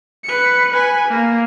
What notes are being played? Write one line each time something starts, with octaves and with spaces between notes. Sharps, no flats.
B4 C#7
B4 G#5
A#3